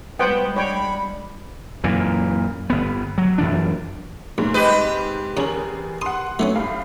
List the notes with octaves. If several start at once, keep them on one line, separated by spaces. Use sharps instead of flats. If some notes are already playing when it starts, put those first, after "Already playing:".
G3 G#3 B3 C5 F#5 G5
D4 C#5 G5 B5
F#2 A#2 E3
G1 B3
F#3
F#2 E3 D4
A1 G#2
G#3 C4 G4 B4 D#5
E2 C#3 G#4 A#4 F#7
F#5 C6 D#6
F#3 A3 B3 C#4
A2 G3 F5